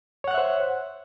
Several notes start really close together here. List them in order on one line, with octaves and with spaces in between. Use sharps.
C#5 F#5 F#6 E5 C5